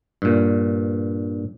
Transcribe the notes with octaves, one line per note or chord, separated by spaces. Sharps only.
G2 A#2